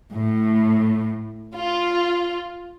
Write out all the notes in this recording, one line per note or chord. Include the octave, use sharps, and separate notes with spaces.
A2
F4